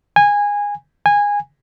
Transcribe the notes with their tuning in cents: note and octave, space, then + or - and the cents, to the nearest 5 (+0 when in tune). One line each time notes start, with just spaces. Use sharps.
G#5 -20
G#5 -20